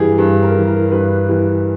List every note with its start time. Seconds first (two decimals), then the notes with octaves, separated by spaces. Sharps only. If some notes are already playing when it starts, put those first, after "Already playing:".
Already playing: G2 E3 G3 G4 G#4
0.18 G2
0.43 A#4
0.55 E3 G3
0.67 A#4
0.92 G2 B4
1.29 E3 G3